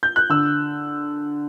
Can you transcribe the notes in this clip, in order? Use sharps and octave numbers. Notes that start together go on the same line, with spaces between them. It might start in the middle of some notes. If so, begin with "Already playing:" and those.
G6
F#6
D3 E6